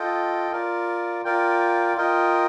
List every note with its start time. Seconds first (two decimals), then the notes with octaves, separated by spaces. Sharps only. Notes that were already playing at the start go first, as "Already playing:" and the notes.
Already playing: F4 A4 D#5 G5
0.52 F4 A#4 D5
1.24 F4 A#4 D5 G5
1.97 F4 A#4 D#5 G5